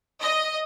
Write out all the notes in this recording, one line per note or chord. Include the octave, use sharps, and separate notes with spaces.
D#5